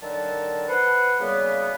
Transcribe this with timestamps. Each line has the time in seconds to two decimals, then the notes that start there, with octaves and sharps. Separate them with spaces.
0.01 D3 D#3 F#3 A#4 A5
0.68 B4 C5 F#5
1.19 F#2 C#3 G3 A#3 B3